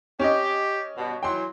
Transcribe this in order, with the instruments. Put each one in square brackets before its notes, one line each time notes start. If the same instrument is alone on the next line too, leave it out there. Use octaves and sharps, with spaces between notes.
[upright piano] C#4 D#5 [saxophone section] G4
[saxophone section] G2 B2
[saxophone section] E3 F#3 [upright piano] G5 C6